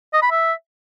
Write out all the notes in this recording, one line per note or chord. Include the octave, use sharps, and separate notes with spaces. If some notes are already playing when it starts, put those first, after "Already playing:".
D#5
B5
E5